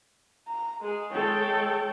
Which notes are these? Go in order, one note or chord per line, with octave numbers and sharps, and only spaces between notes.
A#5
G#3 G#4
G#3 A4 C#5 G5